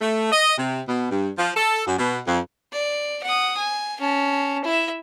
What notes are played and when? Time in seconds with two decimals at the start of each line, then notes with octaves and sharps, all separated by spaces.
0.01 A3
0.32 D#5
0.58 C3
0.88 B2
1.11 G2
1.38 F3
1.57 A4
1.86 F#2
1.99 B2
2.27 F2
2.73 D5
3.23 F#5 D#6
3.57 G#5
4.00 C#4 A5
4.64 E4 E5